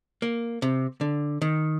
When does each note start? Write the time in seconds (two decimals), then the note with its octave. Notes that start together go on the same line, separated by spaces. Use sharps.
0.22 A#3
0.62 C3
1.01 D3
1.42 D#3